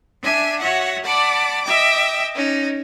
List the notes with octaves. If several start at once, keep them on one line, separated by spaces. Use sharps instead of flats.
D4 E5 G#5
F#4 C#5 E5 F#5
D5 F#5 A5 B5 D6
D#5 E5 G5 D6
C#4 D#4